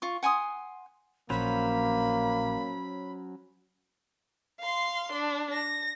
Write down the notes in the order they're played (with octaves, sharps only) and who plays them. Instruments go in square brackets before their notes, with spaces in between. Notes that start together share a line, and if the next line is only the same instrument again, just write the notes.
[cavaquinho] F4 C#6
F#5 G#5 C6 D#6
[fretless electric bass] A#1 [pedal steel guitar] F#3 C#4 C5 [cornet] A#3 [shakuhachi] B5
[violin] F5 C6
D4
A#6